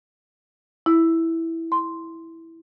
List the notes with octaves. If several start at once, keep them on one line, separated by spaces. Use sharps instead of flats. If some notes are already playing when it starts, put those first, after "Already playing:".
E4
C6